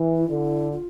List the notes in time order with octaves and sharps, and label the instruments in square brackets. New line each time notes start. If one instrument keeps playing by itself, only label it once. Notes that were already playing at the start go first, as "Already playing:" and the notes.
Already playing: [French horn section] E3
[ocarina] E4
[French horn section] D3
[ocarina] F4